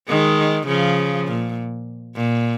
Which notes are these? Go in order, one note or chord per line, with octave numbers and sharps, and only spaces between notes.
D#3 G#3
C#3 F3
A#2
A#2